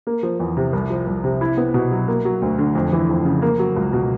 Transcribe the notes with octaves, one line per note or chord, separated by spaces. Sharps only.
A#3
F3
E2
C3
C2
F3
C2
C3
E4
B3
B2
F#3
A#3
F#3
D2
D3
F2
E3
F2
C#3
A#3
F#3
C#2
B2